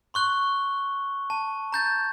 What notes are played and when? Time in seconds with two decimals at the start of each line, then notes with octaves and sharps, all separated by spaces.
0.14 C6 C#6 F#6 G7
1.30 A5
1.72 A#5 G6 A6